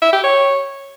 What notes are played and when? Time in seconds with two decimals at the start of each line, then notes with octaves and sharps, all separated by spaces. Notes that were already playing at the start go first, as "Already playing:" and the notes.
0.02 E5
0.13 G4
0.24 C#5